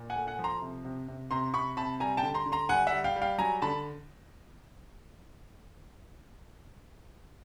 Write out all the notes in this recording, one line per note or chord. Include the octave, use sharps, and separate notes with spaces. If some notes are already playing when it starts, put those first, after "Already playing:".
Already playing: A#2
F#5 G#5
A3
F#5 G#5
F3
A#5 C6
C3
C3
C3
C3 A#5 C6
C3 B5 C#6
C3 A5 B5
G3 G#5 A#5
G5 A5
D3
A#5 C6
D3
A#5 C6
G3 F#5 G#5
E5 F#5
G3
F5 G5
G3
F5 G5
F#3 G#5 A#5
D3 A5 B5